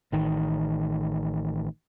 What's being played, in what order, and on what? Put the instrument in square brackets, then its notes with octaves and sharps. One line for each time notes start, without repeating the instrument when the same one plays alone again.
[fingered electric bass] A1 D#3